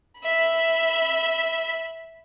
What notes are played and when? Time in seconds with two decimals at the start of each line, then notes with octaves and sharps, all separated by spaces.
0.19 E5 B5